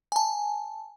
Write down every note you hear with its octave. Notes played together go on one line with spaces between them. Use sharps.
G#5 A5